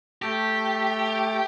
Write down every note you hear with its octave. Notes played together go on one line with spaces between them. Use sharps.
A3 G4